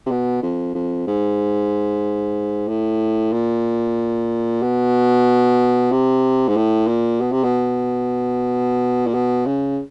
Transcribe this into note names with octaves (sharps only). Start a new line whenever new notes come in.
C3
B2
F2
F2
G#2
A2
A#2
B2
C3
G#2
A2
A#2
B2
C3
B2
A#2
B2
C#3